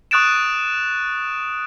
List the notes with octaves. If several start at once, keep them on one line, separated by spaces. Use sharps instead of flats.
C#6 D#6 F#6 A6 D7 E7